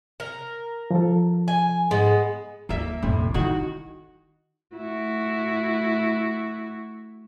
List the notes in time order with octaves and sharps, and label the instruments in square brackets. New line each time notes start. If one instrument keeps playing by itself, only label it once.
[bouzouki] A#4
[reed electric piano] F3 A4
[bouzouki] G#5
[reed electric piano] G#2 [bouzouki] G#3 B3
[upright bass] D#2 [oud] A#3 E5
[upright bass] A#1 F2 [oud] A2 C3
[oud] D#3 F#4 [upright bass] E4
[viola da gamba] A3 E4 F#4